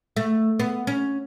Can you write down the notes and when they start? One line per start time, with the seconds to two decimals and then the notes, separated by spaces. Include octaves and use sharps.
0.16 A3
0.60 B3
0.87 C#4